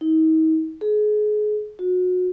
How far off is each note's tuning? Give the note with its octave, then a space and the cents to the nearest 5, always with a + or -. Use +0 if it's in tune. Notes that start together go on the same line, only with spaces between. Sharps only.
D#4 +40
G#4 +30
F#4 -25